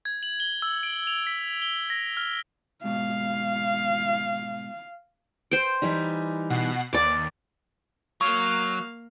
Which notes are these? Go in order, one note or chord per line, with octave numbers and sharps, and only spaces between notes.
G#6
F#7
G7
E6
D7
F7
B6
G7
A#6
F6
G#2 B2 F5
C5 G5
E3 G3 D#4
B2 F#5 C7
D#2 D5 D6
F#3 A#3 F5 C#6